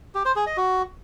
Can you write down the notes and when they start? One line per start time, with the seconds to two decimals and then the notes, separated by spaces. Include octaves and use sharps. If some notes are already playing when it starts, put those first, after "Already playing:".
0.15 G4
0.25 C5
0.36 G#4
0.46 D#5
0.57 F#4